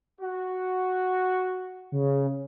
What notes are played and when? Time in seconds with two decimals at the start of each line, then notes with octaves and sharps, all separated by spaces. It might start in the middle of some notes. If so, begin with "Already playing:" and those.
0.21 F#4
1.92 C#3